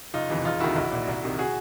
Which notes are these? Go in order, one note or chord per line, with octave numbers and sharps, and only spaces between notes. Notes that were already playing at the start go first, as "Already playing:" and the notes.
F#1 D#4 F4
F2 C3 E3
E1 D#4 F4
D2 C3 D#3 E4 F#4
B1
A#2
C2
C3 D#3
F#4 G#4